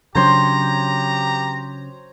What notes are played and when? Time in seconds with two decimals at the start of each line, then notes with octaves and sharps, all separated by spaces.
0.15 C#3 F#3 D4 G4 C5 C#5 A#5 C6